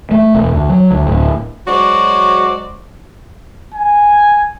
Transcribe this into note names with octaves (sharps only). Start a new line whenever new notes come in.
A3
E1
D2
F#3
D2
D1
F#3 G#3 F#4 C5 D5
G#5